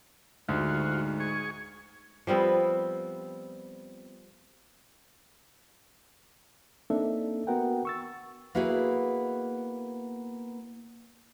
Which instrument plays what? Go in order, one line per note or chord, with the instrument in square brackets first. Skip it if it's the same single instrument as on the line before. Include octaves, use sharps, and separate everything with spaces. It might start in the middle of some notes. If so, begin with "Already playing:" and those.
[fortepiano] D2 [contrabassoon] G#2 [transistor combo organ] F4 F#4
[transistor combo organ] G#4 C#6
[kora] F3 G3 B3 C4
[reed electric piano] A#3 C4 D4 D#4 A4 E5
B3 F#4 A#4 F#5 G5
C#6 E6 A6
[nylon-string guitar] A#3 B3 E4 F#4 G#4